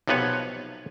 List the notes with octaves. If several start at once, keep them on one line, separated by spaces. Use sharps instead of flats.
B1 C3 F3 B3 B4 C#5